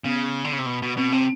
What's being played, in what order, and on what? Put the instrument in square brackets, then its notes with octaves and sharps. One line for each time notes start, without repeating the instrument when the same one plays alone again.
[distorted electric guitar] C#3 [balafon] B3
[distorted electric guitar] D3
C#3
C3
B2
B2
[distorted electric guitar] B2 [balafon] C4
[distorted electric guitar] C3 [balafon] C4